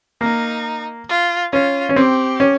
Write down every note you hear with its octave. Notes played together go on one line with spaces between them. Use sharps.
A#3 D#4
F4
C#4 F4
C#4
C4 G4
C#4